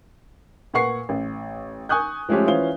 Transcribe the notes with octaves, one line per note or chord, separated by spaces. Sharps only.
A#2 B4 F#5 C#6 C7
A1
G#5 C#6 D#6 F#6 G6
F3 G#3 A3 C#4 G4
E3 C#4 F4 C5 F5 G7